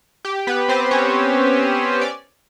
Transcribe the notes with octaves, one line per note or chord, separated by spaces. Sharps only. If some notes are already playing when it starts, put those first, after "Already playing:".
G4
B3 B4
C4 C5
C#4 C#5
D5